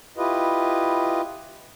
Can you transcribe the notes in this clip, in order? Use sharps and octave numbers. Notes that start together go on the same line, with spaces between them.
E4 F4 G4 B4 D#5